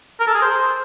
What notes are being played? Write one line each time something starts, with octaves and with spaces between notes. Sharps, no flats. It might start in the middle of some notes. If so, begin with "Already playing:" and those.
A#4
A4
G#4
C5